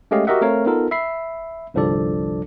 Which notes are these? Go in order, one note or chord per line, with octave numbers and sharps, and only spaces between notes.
G#3 A3 C#4 G4 D#5 F5
F#4 G4 A#4 D#5 E5 F#5
A3 C4 A#4 C#5 F5
B3 D#4 F4 A4 A#4
E5 B5 C7
G1 C2 F3 D4 A4 D5